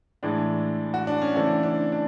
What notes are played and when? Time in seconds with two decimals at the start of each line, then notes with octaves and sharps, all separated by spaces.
0.23 A2 E3 G#3 D4
0.94 F#4
1.07 D4
1.22 C#4
1.35 C#3 E3 A3 C4 D4
1.63 D4
1.92 D4